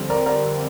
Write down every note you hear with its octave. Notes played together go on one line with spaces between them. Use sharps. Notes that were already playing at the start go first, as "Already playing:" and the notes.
Already playing: F2 D3 G3 C4
A#4 D5
A#4 D5